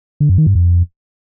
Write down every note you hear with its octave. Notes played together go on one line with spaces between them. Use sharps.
D3
F#2
D#3
G2
F2